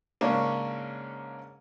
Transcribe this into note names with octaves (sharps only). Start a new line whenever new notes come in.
G#2 C#3 A#3 C#4 D4